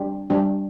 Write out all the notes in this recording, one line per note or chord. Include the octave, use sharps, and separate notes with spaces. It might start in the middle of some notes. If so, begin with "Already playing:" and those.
Already playing: G3 D4 G4
G3 D4 G4